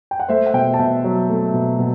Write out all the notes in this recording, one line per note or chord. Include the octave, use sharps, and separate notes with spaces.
G5
F#5
A3 C5 E5
F#5
B2 E5 G5
A5
B2 E5 G5
F#3
A3
B2
B2